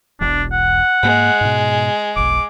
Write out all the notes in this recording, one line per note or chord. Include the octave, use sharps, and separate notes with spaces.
E1 B1 E2 D4
F#5
G#2 G#3 A#3
G#2 B2
F1 B1 D6